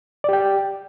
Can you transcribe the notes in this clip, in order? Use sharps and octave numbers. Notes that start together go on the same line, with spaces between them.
G4 D5 G5